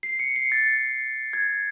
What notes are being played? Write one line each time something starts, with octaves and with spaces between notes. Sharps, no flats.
C7
C#7
C7
A6
G#6